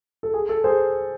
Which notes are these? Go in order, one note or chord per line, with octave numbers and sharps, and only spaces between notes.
A4
G#4
A4
G#4 C5